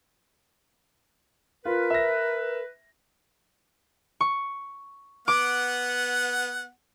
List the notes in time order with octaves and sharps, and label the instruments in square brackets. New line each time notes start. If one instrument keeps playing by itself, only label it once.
[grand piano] F4 [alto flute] A#4 [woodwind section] B4
[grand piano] E5 A#6
[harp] C#6
[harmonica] B3 F#5 [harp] D6